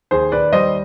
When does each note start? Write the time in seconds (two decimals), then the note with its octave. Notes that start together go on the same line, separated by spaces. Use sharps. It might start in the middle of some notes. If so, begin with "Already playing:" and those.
0.11 D#2 G#4 C5
0.32 D#2 B4 D5
0.53 G3 C5 D#5